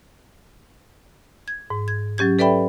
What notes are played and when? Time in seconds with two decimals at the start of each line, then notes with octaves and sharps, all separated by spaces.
1.48 G#6
1.70 G#2
1.88 G#6
2.18 F#3 C#4 G4 G#6
2.39 A4 B4 D5 E5 G5 B5